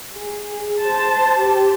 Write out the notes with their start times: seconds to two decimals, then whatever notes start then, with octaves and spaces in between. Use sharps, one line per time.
0.15 G#4
0.79 C5 A5
1.39 G4